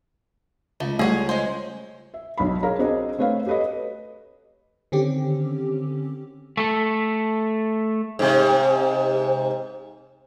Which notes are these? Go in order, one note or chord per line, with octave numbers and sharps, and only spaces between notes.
C#2 A3
G3 A3 G#4 C#5 F#5
G#3 C#4 C5
E5
B1 D4 B5
G#4 A#4 C#5 F5 A#5
C4 D4 F#4 G#4 D#5
A3 C4 B4 C#5 F5
G4 A4 B4 C#5 D#5
D3 D#3 C4 C#4 G4
A3 A4
G#2 C3